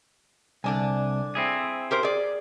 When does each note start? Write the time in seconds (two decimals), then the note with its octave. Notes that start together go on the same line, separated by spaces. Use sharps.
0.64 C2 D3 D4 G#5
1.35 C4 E4 G#4
1.91 G4 A#4 C5
2.03 G#4 D5